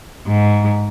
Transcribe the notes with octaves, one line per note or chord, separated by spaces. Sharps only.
G#2